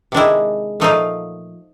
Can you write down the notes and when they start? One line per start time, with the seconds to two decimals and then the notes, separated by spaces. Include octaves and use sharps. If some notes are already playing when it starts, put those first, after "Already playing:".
0.12 C3 D#3 G#3 D4 E4
0.80 A#2 F3 A3 D#4 F4